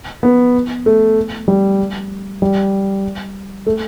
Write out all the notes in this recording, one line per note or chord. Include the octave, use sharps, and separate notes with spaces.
B3
A3
G3
G3
A3